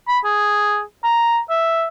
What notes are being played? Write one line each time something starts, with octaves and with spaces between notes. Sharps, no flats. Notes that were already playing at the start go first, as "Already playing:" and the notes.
B5
G#4
A#5
E5